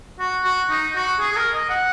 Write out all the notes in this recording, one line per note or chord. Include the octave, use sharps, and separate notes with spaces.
F#4
F#4
D#4
F#4
G#4
G#4
A#4
D#5
F#5